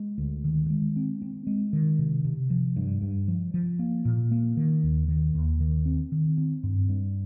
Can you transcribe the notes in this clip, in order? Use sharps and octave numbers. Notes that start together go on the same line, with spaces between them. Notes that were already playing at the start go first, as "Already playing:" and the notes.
Already playing: G#3
D2
D#3
G#3
C4
C4
G#3
D#3
C3
C3
F3
G2
G2
F3
F3
A#3
A#2
A#3
D#3
D#2
D#3
D#2
D#3
C4
D#3
C4
G2
G2